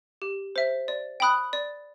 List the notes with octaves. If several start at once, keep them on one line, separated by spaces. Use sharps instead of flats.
G4
C5 E5
D5
G5 B5 D#6 F#6
D5